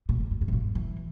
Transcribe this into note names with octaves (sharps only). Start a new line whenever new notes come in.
A#2
G2
G2
G2
A#2
G#2
E3